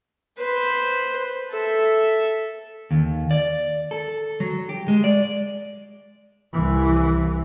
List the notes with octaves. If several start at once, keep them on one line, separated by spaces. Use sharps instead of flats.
B4 C5
A4 E5
D#2
D5
A4
F#3
G4
G#3
D5
C2 E3